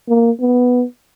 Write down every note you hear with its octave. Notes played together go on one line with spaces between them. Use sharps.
A#3
B3